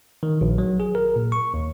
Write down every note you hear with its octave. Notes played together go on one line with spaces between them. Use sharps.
D#3
A#1
F#3
G#4
A#4
A#2
C#6
D#2